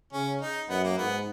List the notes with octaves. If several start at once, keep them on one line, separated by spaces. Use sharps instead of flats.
C#3 C#4
D#4
F#2 B3
A#3
G#2 B3